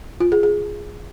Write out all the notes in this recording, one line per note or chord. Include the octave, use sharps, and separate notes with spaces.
F4
G#4
G#4